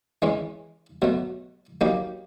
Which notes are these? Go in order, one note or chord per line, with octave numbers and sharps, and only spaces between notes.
E3 G#3 C#4
B2 F#3 A3
F#3 A#3 D#4 G4